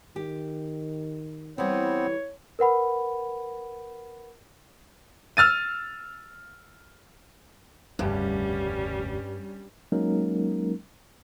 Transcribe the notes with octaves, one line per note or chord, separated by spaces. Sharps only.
D#3 G4
E3 G3 B3 C4 C#5
A#4 B4 F#5 B5
E6 F6 A6 D#7
F1 D2 G2 C#3 G3 C#4
F#3 G#3 A#3 C#4 D#4 A#4